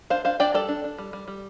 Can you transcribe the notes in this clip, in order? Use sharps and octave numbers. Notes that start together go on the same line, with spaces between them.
D4 C5 F5
D4 C5 F5
D4 D5 G5
G3 A4 D5
D4
D4
G3
G3
G3